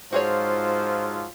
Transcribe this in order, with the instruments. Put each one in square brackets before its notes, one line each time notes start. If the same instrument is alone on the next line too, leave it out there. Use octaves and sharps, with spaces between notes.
[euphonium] G#2 [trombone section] F3 F#3 F4 [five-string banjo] F#4 G#4 C#5 [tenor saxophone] C5